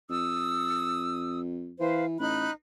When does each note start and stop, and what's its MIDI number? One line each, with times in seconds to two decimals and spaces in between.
0.09 1.75 41
0.09 1.40 87
0.09 1.40 88
1.79 2.17 52
1.79 2.04 71
1.79 2.04 72
1.79 2.04 77
2.19 2.47 33
2.19 2.51 63
2.19 2.51 83
2.19 2.51 90